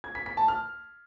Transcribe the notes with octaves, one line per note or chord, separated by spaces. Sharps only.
G#6
B6
B6
A5
F6